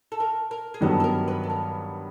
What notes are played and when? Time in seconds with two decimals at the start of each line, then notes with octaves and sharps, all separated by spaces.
0.12 A4
0.20 A#4
0.51 A#4
0.74 G#4
0.81 G2 D#3 F#3 B3 A4
1.00 A4
1.04 A#4
1.28 B4
1.44 A4
1.50 A#4